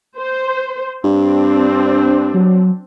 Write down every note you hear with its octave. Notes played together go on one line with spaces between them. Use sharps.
C5
G2 C4 D4
F#3